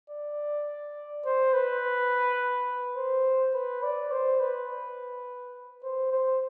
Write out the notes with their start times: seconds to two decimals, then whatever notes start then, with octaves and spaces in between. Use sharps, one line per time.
0.10 D5
1.25 C5
1.53 B4
2.97 C5
3.54 B4
3.83 D5
4.12 C5
4.40 B4
5.83 C5
6.12 C5